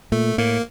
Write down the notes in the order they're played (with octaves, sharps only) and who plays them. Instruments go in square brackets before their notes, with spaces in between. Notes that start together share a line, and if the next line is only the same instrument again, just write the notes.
[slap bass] A#2 [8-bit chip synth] A3
[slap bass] A2 [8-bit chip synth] A#3